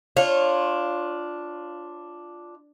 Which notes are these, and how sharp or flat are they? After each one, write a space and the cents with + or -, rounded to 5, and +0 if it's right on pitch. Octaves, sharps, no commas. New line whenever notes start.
D4 +0 F4 +0 C#5 -25